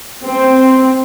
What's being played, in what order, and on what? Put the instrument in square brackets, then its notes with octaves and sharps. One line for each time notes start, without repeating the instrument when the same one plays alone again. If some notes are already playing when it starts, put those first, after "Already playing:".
[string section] C4